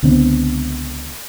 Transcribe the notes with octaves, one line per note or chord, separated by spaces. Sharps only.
C#2 D3 B3 C4